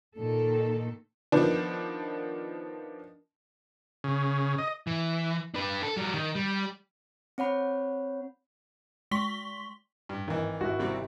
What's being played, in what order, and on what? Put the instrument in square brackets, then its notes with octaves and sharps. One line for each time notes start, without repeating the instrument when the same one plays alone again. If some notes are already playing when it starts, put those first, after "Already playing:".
[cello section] A#2 D#3 A4
[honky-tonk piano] D#3 F3 B3 D4
[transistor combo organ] C#3
D#5
[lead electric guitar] E3
D4 B4
A4
F#3 G3
D#3
G3
[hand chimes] C4 C#5 F#5 B5
[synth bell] G#3 C6 C#6 B6 G7
[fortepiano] G2
[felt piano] G#1 [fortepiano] D#3 E3
[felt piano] G#1 E4 [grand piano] F#4
[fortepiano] C3 G3 C4